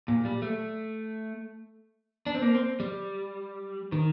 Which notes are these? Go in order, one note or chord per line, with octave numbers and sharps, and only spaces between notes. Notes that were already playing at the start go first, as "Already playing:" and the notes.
A#2
G3
A3
D4
C4
A#3
C4
G3
D#3